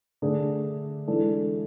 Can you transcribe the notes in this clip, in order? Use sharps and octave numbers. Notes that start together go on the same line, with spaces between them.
D3 A3 D4 G#4
E3 G#3 D4 A4